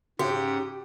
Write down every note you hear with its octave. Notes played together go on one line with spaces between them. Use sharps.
G#2 C#3 F#4 G4 F#5